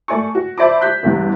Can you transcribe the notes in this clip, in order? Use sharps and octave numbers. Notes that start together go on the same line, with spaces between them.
A3 D5 G#5 C#6
F#4
C5 D5 E5 A5 B5 D6
F#6 G6 B6
A1 E2 G2 G3